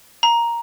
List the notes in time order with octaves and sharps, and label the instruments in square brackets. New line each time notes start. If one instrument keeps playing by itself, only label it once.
[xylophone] A#5